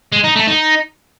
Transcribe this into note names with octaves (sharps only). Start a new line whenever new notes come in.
G#3
D#4
A3
D#4